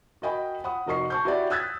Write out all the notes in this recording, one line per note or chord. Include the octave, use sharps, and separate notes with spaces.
F#4 A#4 D#5 G5 G#5 B5
F#5 B5 D#6
F1 F#4 A#4 D#5 C#6 C7
A5 C#6 G6
E4 F#4 G4 B4 C#5 D5
D#6 E6 F#6 G#6 A6 B6